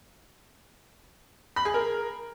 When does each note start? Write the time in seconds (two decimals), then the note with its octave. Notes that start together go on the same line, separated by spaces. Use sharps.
1.56 B5
1.65 G#4
1.74 A#4